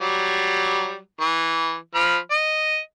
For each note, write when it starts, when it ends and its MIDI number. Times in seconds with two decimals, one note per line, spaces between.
0.01 0.98 54
0.01 0.98 55
1.20 1.76 52
1.95 2.17 53
1.95 2.17 83
1.95 2.17 89
2.31 2.79 75